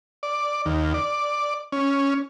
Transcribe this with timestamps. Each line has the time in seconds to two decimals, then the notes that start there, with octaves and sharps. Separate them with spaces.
0.23 D5
0.66 D#2
0.94 D5
1.72 C#4